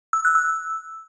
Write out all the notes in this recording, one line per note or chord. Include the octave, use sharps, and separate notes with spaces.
E6
F#6
E6